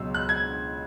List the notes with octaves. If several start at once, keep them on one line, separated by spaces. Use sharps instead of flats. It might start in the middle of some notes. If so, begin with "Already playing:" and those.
Already playing: C#2 B2 F#3 E6
F#6
G#6